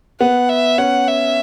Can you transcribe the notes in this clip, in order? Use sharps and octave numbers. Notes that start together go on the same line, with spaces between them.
B3 F#5
E5
C#4 F#5
E5